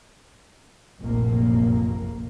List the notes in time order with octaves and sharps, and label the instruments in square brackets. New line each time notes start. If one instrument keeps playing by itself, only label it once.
[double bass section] F1 A#1 F#2 A#3